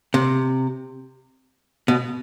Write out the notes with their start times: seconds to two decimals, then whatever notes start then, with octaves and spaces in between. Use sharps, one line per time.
0.14 C3
1.88 B2